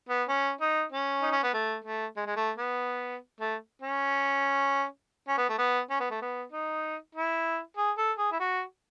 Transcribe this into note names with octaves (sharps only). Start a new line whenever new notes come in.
B3
C#4
D#4
C#4
D#4
C#4
B3
A3
A3
G#3
G#3
A3
B3
A3
C#4
C#4
B3
A3
B3
C#4
B3
A3
B3
D#4
E4
G#4
A4
G#4
E4
F#4